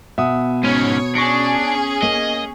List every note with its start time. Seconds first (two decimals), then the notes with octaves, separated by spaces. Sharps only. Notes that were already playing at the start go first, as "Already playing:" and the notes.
0.18 B2 E5 F#5 D#6
0.64 G#2 C#4 C#5 D#7
1.15 C#4 D4 G#4 C#6 A#6 C#7
2.03 A#3 D#5